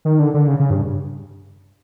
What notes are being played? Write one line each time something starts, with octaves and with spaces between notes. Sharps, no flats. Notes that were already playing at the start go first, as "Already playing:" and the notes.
D#3
D3
D3
C#3
C#3
G2